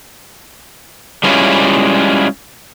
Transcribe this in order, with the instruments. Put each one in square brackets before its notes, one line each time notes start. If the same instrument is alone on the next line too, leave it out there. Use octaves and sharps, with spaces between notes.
[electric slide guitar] G3 G#3 C#4 E4 F4